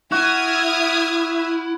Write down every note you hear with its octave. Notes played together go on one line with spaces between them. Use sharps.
E4 F#4 D#6 F6 G#6